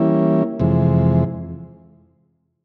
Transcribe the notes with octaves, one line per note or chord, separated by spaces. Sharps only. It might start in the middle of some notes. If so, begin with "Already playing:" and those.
Already playing: E3 G3 A#3 C#4 E4
F2 C3 E3 G#3